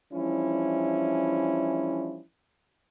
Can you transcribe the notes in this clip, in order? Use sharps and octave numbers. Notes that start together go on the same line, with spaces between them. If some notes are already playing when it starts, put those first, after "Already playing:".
E3 F3 G3 C#4 D4 E4